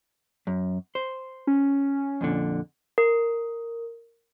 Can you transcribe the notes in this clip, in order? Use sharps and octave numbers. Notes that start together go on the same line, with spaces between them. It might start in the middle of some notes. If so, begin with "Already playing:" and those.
F#2
C5
C#4
F2 A#2 D3
A#4